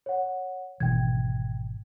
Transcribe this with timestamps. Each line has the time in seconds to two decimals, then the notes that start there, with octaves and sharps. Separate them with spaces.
0.06 C#5 F#5
0.80 G#1 B2 E3 G5 G#6